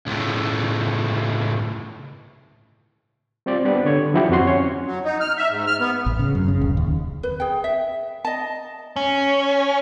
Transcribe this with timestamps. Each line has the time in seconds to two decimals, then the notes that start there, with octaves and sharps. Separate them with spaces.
0.07 C#2 A2
3.46 G3 C4 F4 G4 D5
3.65 B3 D4 G4 B4 D5
3.85 D3 C#5 G#6
4.14 F3 F#3 E4 F#4 G4
4.29 F2 C4 F#4 C6
4.46 C#4 C#5
4.87 F#3
5.04 D#4
5.20 F6
5.37 E5
5.50 G#2
5.67 F6
5.80 B3
6.06 A1
6.19 C#3
6.35 F#2
6.48 C#3
6.61 D1
6.77 D#2
7.23 B4
7.40 G#4 G5
7.64 E5
8.25 D#5 A5
8.96 C#4